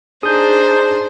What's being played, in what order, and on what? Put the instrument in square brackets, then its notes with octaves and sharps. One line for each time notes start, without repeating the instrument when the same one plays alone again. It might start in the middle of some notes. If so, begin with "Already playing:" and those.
[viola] D4 D#4 [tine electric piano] G#4 [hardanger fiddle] C5 [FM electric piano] D#6 G6